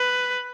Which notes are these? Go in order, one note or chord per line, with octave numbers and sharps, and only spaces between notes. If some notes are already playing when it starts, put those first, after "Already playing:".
Already playing: B4